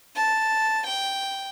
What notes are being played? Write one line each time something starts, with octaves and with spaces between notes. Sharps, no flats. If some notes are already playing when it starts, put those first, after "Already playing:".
A5
G5